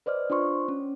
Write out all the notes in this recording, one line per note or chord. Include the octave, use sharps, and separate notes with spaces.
B4 C5 D5 D#5 F6
D4 F4 C5 C6 C#6
C#4